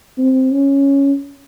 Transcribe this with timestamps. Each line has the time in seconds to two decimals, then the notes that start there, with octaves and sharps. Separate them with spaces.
0.18 C4
0.52 C#4